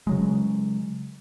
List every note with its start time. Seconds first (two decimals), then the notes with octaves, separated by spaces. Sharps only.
0.07 C#3 F#3 G#3